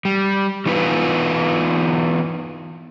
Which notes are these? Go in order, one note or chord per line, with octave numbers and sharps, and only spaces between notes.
G3
E3 B3 D#4 F4 B4